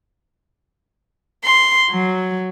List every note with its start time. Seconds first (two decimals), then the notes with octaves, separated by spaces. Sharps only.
1.44 C6
1.90 F#3